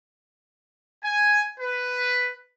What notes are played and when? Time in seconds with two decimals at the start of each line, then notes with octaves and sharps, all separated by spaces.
1.04 G#5
1.60 B4